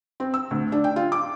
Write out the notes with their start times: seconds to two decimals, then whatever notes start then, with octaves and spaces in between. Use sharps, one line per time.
0.20 C4
0.34 E6
0.51 D2
0.72 D4
0.84 G5
0.96 F4
1.12 D6